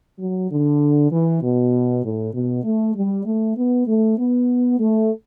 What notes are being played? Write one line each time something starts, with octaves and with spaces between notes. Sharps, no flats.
F#3
D3
E3
B2
A2
B2
A3
G3
A3
B3
A3
B3
A3